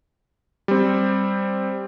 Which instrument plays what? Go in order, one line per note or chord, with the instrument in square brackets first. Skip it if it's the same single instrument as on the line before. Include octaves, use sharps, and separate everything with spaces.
[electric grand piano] G3 C4